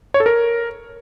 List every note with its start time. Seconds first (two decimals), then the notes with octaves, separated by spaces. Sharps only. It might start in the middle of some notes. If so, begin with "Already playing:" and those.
0.14 C#5
0.20 A4
0.26 A#4